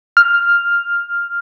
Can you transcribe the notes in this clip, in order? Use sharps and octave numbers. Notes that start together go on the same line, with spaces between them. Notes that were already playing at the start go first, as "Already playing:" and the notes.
F6